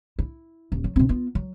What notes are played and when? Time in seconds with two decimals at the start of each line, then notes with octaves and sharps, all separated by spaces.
0.19 E4
0.72 D#1
0.84 F#3
0.96 B2 C4
1.09 B3 F4
1.35 F#3